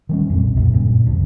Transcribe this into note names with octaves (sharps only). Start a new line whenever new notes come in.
D#3 G3 C#4
F2 A#2 C4
B1
D#1 F#2 A#2
G2 A#2 C#3
B1 F2 D3